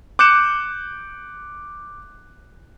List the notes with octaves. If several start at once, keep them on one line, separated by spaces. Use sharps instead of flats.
D6 F#6 G6 C#7 E7